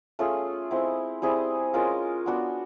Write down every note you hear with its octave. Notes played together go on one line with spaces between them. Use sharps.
A3 C#4 F4 G#4
G#3 C4 E4
G3 C4 E4 G#4
G#3 C#4 F4 A#4
B3 D4 F#4